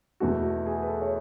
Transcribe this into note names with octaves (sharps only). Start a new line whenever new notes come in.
E2 B2 A3 F#4
G#4
B4
A4
C#5